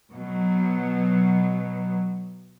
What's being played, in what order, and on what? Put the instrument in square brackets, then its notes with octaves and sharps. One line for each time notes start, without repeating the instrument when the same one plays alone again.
[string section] B2 F#3